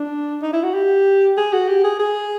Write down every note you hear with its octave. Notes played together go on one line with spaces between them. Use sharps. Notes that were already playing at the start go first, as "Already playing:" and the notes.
Already playing: D4
D#4
E4
F#4
G4
G#4
F#4
G4
G#4
G#4